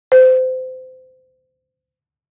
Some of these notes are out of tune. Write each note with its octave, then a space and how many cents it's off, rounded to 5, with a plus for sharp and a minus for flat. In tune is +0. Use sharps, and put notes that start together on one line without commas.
C5 -25